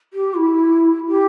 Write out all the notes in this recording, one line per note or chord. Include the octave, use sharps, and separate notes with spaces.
G4
E4
G4